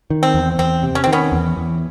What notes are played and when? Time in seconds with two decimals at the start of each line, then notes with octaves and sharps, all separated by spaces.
0.10 D#3
0.23 C4
0.34 E2
0.59 E2 C4
0.83 C3
0.95 C#4
1.04 C4
1.07 D#3
1.12 B3 C#4
1.32 E2
1.57 E2